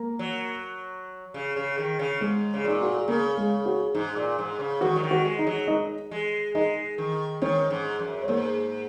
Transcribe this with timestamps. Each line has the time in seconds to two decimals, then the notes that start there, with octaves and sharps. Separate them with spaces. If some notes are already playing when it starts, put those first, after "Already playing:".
Already playing: A#3 A#4
0.19 F#3
1.34 C#3
1.56 C#3
1.78 D#3
1.99 C#3
2.21 G#2 G#3 G#4
2.54 C#3
2.64 A#2 D#4
2.81 F#4
2.94 G#4
3.08 C#3 A#3 A#4
3.36 G#3 G#4
3.66 F#4
3.94 G#2 D#4
4.16 A#2
4.38 G#2
4.60 C#3
4.81 D#3 F#4
4.96 F#3
5.03 D#3
5.11 F#4
5.25 G#3
5.39 D#4
5.47 F#3
5.68 D#4 D#5
6.11 G#3
6.55 G#3 D#4 D#5
6.98 D#3
7.42 D#3 C#4 C#5
7.70 G#2
7.99 F#2
8.22 C#5
8.28 G#2 A#3 A#4